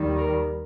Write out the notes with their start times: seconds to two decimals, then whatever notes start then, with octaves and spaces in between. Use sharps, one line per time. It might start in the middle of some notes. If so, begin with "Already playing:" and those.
Already playing: D#2 D#3 G3
0.17 A#4